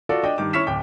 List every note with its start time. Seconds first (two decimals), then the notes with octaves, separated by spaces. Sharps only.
0.09 F4 F#4 A4 D5
0.23 D4 D#5 G5 D6
0.38 G2 D#3 D6
0.53 C#4 E4 C#6 F6 B6 E7
0.67 D1 G5 D6